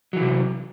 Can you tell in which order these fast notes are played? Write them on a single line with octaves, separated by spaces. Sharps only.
F#3 E3 C3